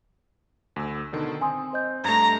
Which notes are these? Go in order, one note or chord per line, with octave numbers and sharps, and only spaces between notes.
D2 E6
B2 D3 D#3
C4 G#5 C6 D#6
C5 D#5 G6
G2 A3 A#5 G#6